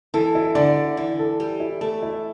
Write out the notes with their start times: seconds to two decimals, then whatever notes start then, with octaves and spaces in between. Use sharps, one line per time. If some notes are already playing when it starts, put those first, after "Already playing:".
0.14 E3 A4
0.35 E4
0.55 D3 D5
0.76 E4
0.97 E3 D5
1.19 A4
1.39 G3 A4
1.60 E4
1.81 A3 A4
2.03 E4